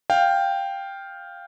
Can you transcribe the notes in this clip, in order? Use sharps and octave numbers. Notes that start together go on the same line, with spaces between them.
F5 G5